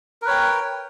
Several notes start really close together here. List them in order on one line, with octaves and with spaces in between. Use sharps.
A#4 B4 C#5 G5